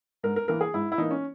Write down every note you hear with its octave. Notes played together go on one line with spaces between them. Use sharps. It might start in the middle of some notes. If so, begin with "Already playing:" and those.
G#2 A#4
A#4
E3 A#3 A#4
G#4
G#2 E4
E4
E3 A#3 D#4
C#4